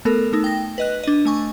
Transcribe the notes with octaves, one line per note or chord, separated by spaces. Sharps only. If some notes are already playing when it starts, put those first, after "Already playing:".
A3 B3 A4 A#4
A3 D#4
G5 A#6
B4 D#5 F#6
D4 D#5
A3 G#5 C#6